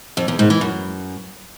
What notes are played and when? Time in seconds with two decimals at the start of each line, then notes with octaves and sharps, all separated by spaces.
0.17 F2
0.28 E2
0.39 G#2
0.50 E3
0.61 F#2